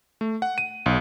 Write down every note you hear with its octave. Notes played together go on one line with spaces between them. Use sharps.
A3
F#5
D#7
B1